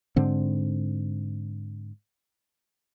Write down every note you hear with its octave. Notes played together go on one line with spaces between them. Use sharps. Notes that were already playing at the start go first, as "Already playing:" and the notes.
G#2 D3 C4